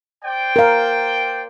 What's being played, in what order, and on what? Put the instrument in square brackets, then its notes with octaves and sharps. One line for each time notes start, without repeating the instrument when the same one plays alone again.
[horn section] C5 D5 G5
[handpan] A#4 F5